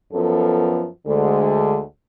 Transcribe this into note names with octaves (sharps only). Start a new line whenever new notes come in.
F#2 F3 B3 A4
D2 D3 G#3